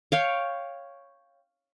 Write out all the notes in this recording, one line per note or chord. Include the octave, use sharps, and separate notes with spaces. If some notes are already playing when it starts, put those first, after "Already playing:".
C#5 F5 G5